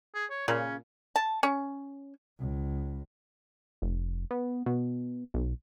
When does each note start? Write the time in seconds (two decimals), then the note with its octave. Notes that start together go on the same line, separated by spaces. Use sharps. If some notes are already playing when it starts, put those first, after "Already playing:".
0.15 G#4
0.30 C#5
0.48 A#2 C#3 C#4
1.16 A5
1.43 C#4
2.39 C#2
3.82 F1
4.31 B3
4.66 B2
5.34 B1